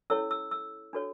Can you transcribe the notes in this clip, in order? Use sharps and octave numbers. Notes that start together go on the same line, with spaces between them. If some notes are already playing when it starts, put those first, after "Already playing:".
C#4 E4 A4 C#5 E6
E6
E6
D4 F#4 A4 C#5